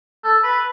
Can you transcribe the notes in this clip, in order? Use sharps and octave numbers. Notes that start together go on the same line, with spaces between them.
A4
B4